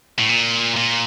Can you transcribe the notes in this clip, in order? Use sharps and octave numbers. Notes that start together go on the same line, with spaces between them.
A2
A#2
A#2